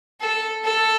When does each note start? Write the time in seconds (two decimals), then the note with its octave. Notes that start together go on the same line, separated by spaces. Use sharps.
0.20 A4
0.64 A4